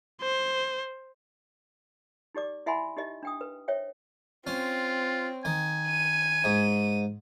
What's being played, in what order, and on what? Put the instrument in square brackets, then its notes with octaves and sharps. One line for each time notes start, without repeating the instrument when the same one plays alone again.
[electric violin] C5
[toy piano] D#4 G4 D5 D6
E4 E5 F#5 G#5 B5 C6
D#4 G4 D#5 E5
D4 G5 D#6
B4
C5 C#5 E5 G5
[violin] C4 [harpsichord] C#4 [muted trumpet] F4
[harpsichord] D#3 [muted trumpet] G#5
[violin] D#7
[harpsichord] G#2